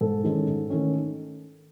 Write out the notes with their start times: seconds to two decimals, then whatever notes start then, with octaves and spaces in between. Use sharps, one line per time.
0.01 G#2 A4
0.24 D#3 G#3 C#4
0.47 G#2
0.70 D#3 A3 C#4